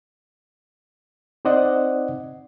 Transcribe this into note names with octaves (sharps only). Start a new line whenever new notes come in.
C4 D#4 C5 D5 D#5 F#5